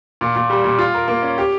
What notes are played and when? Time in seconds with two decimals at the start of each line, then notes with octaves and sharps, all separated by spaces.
0.21 A#2
0.35 A#2
0.50 G3
0.64 A#2
0.79 F4
0.94 A#4
1.08 A#3
1.23 C#4
1.38 G4